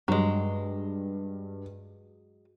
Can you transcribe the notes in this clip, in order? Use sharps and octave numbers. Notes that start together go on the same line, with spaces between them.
G2 F#3 G#3